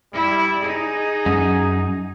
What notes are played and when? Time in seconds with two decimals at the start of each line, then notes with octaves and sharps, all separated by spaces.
0.13 G3 E4
0.63 D#4 G#4
1.26 F#2